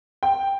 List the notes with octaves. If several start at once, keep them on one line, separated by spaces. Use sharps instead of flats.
G5